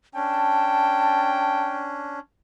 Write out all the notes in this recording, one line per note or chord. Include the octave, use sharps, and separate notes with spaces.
C#4 D4 G5 A5